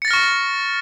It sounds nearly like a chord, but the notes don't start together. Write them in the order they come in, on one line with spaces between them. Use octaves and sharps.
C#7 A6 A#6 F6 C#6